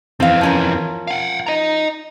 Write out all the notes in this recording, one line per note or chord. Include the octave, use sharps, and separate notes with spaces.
F2 E3 C4 F5
F3 C#4 A#4
F5 F#5
D#5 A#5